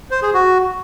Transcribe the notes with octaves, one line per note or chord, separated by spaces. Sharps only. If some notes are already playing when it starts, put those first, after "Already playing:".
C5
G#4
F#4